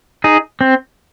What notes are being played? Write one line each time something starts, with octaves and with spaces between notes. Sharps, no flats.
D#4 G#4
C4